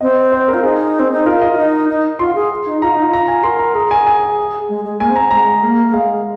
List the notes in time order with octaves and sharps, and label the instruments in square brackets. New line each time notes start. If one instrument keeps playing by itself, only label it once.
[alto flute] C4 [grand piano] D#5
[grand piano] C5
A#4
[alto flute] F4
[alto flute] D#4 [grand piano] G#4
[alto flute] C4
D#4
[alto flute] F4 [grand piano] A#4
[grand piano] D#5
[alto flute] F4
D#4
D#4
[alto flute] F4 [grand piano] C6
[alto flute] G#4
D#4
[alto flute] F4 [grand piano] A#5
[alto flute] D#4
F4
[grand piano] A#5
G#5
[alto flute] A#4 [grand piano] C6
[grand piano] A#5
[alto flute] G#4 [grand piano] A#5
[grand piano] G#5
G#5
[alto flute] G#3
G#3
[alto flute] A#3 [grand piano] G#5
[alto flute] C4
[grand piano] A#5
[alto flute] G#3 [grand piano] A#5
[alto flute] A#3
A#3
[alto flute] G#3 [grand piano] F5